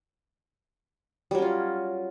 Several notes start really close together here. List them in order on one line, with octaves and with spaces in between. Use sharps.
G3 F#3 C#4 F4